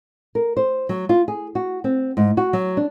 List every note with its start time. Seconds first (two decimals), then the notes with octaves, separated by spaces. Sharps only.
0.35 A#4
0.57 C5
0.89 F#3
1.09 F4
1.28 G#4
1.55 F#4
1.84 C4
2.17 G#2
2.37 F#4
2.53 F#3
2.77 D4